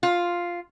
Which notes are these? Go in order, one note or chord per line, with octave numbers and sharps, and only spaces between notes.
F4